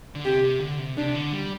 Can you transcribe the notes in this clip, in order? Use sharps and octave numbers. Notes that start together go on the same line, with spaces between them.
D3
C3 G4
C3
D3
C3
C3 D4
D3
G3